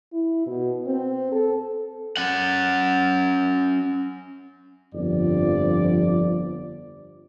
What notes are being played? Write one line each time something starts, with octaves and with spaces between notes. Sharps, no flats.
E4
B2
C4
A4
C#4 F#5
G1 F2 F3 D5